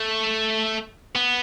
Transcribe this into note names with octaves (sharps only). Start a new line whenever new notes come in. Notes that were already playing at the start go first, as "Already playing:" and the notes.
Already playing: A3
B3